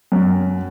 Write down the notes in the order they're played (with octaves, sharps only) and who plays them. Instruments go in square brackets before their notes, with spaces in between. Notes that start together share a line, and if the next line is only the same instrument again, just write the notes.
[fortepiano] F#2